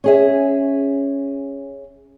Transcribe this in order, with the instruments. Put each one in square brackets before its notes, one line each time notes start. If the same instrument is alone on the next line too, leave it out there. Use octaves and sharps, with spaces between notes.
[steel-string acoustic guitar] C#4 G#4 E5